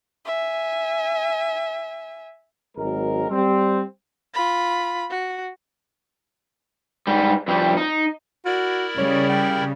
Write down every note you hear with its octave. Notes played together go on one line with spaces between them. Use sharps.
E5 G#5
G#1 F#3 G#3 A#4
G3 C4
F4 B5
F#4
G#2 G3
F2 G3
D#4
E4 F#4 A#4 D5
C#3 G3 C#5
G5